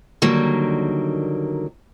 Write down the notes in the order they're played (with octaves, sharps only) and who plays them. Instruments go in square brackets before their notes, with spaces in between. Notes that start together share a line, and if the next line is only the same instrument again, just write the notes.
[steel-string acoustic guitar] D3 D#3 F#3 G3 A#3